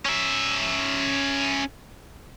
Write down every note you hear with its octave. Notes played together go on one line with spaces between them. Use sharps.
C#4 E5